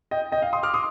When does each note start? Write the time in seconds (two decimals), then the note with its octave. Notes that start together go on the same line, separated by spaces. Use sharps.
0.11 D#5 G5
0.32 D#5 G5
0.42 F5
0.53 C6 D#6
0.63 D6 F6
0.74 C6 D#6